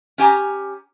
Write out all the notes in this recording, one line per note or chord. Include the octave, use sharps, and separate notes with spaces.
C#4 G4 G#5 A#5